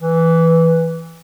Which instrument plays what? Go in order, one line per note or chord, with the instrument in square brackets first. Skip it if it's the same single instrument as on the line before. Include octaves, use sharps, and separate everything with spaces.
[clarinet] E3